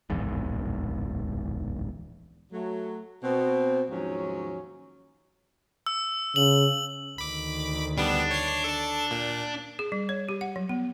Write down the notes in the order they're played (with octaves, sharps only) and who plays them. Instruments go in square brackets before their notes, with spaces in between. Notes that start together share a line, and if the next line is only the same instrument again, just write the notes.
[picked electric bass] D1 A#1 E2 G#2
[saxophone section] F#3 A3
B2 C4
D#2 G#2 F3 F#3 C#4
[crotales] E6
[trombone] C#3 [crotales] F#7
[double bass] D2 D#3 [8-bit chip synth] B5 D6
[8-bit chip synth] G3 B3 [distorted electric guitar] D4
[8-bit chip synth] C#5 C7
A4 A5
A#2
[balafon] G#4
G3
C#5
G4
F#5
F#3
B3